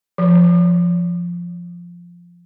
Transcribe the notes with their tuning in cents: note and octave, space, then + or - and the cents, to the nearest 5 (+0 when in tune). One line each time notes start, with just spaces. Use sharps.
F3 -5